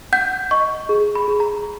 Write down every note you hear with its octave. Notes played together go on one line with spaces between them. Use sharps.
F#5 G6
D#5 C#6
G#4
B5
G#4
A#5